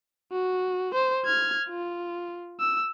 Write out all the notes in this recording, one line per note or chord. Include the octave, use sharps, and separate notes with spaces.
F#4
C5
F6 G#6
F4
E6